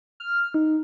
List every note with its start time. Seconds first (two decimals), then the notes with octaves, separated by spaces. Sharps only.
0.20 F6
0.54 D#4